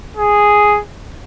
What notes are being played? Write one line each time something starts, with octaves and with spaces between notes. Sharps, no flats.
G#4